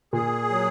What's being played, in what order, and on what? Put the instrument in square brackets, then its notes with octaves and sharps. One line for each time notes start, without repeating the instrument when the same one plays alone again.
[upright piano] A#2 [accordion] G#4
[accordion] F#3